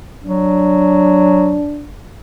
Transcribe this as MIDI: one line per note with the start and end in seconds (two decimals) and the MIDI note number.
0.24 1.59 54
0.24 1.91 62